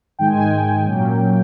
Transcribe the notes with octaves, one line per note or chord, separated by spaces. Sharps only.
G#2 D#3 G#3 G5
G#5
G5
A#2 F#3 A#3 C#4